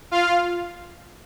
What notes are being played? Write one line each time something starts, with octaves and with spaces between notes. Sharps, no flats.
F4 F5